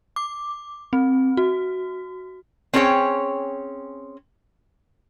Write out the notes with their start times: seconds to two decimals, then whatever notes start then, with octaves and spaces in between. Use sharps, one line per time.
0.16 D6
0.93 C4
1.37 F#4
2.74 C4 C#4 G#4 C#5 G5